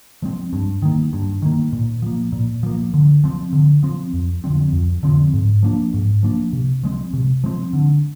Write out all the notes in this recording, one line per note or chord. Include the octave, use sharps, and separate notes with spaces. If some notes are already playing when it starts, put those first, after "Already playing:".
F3 G#3 C4
G2
D#3 A#3
G2
D#3 A#3
A#2
F3 A#3
A#2
F3 A#3
D3
F3 C4
D3
F3 C4
F2
D3 F3 C4
F2
D3 F3 C4
G#2
F3 A#3 D4
G#2
F3 A#3 D4
C3
F3 G#3 C4
C3
F3 G#3 C4
D3